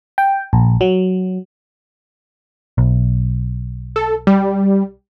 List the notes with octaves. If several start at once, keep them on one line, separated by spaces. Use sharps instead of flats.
G5
A#1
F#3
B1
A4
G3